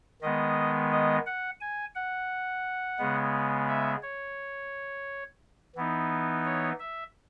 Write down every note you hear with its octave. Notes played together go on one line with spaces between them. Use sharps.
D#3 G#3 B3 D#5
D#5
F#5
G#5
F#5
C#3 G#3 B3
E5
C#5
E3 B3 D#4
C#5
E5